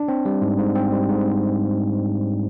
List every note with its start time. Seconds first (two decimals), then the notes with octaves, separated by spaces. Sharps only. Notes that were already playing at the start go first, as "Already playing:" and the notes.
Already playing: D4
0.08 C4
0.25 G3
0.42 G#2
0.58 G#2
0.75 C4
0.92 G3
1.09 G#2